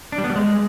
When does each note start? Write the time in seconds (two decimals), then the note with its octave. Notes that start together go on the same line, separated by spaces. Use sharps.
0.12 D4
0.18 G3
0.24 B3
0.30 G3
0.36 G#3